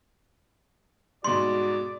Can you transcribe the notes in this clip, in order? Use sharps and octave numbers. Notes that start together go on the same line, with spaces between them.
G#2 B2 G3 F#4 D5 C6